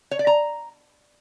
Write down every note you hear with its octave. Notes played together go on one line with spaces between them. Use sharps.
C#5
D5
A#5